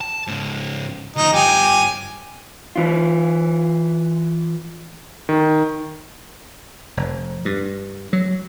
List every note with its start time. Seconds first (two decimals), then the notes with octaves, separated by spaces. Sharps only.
0.01 A5
0.27 G#2 C#3
1.16 D2 F3 D#4
1.33 G2 F4 G4 G#5
2.76 E3 F4
5.29 D#3
6.97 F1
7.45 G2
8.13 F#3